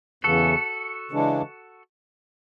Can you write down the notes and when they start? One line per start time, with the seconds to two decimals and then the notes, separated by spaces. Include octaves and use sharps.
0.24 E2 C#3 E3 F#4 A4
1.11 C#3 E3 G#3 D4